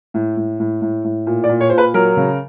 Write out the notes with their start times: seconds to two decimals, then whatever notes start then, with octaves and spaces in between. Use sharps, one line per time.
0.14 A2
0.37 A2
0.60 A2
0.82 A2
1.04 A2
1.27 A#2
1.44 D5
1.49 A#2
1.61 C#5
1.70 A#2 C5
1.78 B4
1.94 F#3 A#4
2.17 C#3